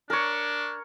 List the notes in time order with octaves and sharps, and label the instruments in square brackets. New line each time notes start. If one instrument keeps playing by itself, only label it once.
[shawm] D4 [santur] A#4 C#5